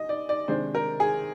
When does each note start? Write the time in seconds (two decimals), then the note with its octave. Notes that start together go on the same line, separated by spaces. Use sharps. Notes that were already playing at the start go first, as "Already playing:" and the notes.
Already playing: D#5
0.09 D5
0.29 D5
0.48 C3 D#3 G#3 D4 C5
0.75 A#4
1.00 G#4